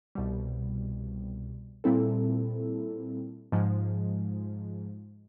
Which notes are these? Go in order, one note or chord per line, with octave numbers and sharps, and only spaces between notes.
C2 B2 G3
A#2 G3 C4 E4 A4
G#2 F3 G#3